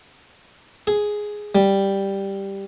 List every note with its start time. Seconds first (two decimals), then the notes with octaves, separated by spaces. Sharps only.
0.87 G#4
1.55 G3